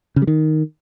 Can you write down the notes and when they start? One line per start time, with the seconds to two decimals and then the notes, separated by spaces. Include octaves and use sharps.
0.16 C#3
0.22 G3
0.27 D#3